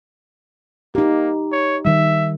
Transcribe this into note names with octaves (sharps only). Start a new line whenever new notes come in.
A#3 D#4 G4
C#5
D#3 G3 E5